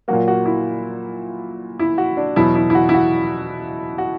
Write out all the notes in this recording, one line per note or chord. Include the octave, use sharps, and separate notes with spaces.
A#2 F#3 A#3 F#4
F#4
E4
E4
F#4
D4
E2 B2 F#3 B3 E4
E4
E4
F#4
E4
F#4
F#4